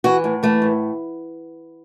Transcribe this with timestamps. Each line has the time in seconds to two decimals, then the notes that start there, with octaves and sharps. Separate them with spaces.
0.04 E3 F#4
0.24 A2
0.43 E3 A3
0.62 A2